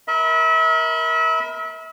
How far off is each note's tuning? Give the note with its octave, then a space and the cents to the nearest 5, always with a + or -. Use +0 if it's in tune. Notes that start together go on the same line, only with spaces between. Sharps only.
A#4 +20 E5 -35 B5 +0